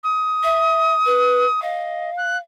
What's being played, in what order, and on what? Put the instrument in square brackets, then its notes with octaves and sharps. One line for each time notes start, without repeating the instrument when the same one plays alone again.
[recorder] D#6
[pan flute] E5
B4
[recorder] D#5 [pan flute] F5
[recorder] F#6